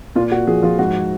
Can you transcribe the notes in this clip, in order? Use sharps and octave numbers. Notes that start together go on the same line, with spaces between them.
A#2 F4
A#2 F#4
F3 G#4
F3 F4
G#2 F#4